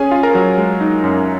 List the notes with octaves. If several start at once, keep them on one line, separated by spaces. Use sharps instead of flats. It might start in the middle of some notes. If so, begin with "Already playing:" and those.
Already playing: C#4 G#4 G#5
F4
A#4 A#5
F#3
G#3
D#4
F#2